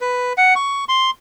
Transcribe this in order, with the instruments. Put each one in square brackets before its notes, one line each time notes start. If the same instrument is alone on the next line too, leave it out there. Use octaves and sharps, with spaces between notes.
[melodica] B4
F#5
C#6
C6